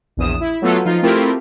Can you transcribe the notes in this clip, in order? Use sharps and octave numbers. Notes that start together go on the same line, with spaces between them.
A#1 E2 D#6 E7
E4
F#3 A3 B3 F4 A4
F3 D#4 F4
A3 C4 E4 F4 G4 A#4